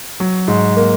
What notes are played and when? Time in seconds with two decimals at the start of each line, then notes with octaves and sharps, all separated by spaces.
0.20 F#3
0.48 G#2
0.76 A#3